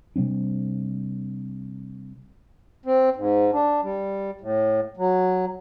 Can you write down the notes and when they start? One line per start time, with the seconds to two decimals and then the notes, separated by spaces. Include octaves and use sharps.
0.16 C3 G3 C4 D4
2.84 C4
3.16 G#2
3.52 D4
3.83 G3
4.41 A2
4.97 F#3